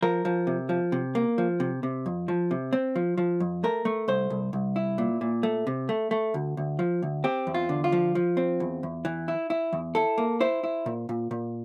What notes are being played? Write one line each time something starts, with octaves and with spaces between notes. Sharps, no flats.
F3 A#4
F3
C3
F3
C3
A#3
F3
C3
C3
F2
F3
C3
C4
F3
F3
F2
A3 A#4
A3
C2 C5
C2
C2
E4
A#2
A#2
A3
C3
A3
A3
D2
D2
F3
D2
C4 G4
E2
F4
D3
F4
F3
F3
C4
E2
E2
E3
E4
E4
E2
E4 A4
A#3
E4 C5
E4
A#2
A#2
A#2